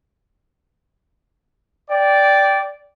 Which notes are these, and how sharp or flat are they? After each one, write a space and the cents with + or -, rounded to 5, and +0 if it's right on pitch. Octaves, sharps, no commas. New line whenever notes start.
D5 -10 G5 +0